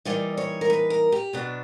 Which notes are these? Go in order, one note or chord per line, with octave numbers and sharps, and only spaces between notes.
E3 G3 A#3 D#4 D5
C#5
A#4
B4
A#4
G4
B2 F#3 B3 D4